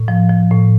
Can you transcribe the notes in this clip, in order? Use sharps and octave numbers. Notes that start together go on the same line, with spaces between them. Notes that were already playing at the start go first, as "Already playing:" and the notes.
Already playing: A2
F3
F3
A2